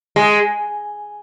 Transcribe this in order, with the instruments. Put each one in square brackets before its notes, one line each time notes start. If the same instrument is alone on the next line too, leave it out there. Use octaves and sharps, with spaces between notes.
[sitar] G#3